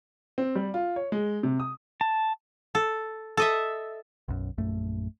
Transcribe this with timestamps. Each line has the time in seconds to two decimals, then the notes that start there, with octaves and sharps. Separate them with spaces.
0.38 C4
0.55 G3
0.74 F4
0.96 C#5
1.12 G#3
1.43 C3
1.60 D#6
2.01 A5
2.75 A4
3.37 A4 D#5 E5
4.28 B1 F#2
4.58 A#1 F#2 A3